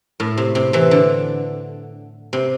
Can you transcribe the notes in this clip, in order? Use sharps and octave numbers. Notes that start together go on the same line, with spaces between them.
A2
C3
C3
C3 E3
D3
C3